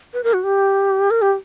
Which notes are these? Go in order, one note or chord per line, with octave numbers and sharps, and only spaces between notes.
B4
A#4
F#4
G4
A#4
G4